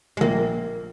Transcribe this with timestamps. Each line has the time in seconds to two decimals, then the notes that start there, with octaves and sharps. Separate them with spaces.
0.17 G#3
0.21 A#1 A#2 A#3